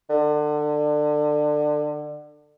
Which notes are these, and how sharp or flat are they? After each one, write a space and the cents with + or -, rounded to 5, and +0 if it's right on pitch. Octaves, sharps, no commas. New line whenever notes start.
D3 +25